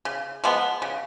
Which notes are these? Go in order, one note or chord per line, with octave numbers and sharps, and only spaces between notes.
C#3
F3 G#3 B3
C#3